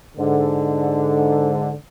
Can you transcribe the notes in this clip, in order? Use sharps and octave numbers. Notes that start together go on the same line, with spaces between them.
G#2 D3